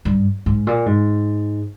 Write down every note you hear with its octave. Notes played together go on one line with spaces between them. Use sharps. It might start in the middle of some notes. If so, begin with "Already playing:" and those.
G2
G#2
A#2
G#2